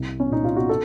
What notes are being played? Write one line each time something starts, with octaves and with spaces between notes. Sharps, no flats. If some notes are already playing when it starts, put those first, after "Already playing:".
Already playing: C2
C#4
A#2 D#4
F4
F#4
A4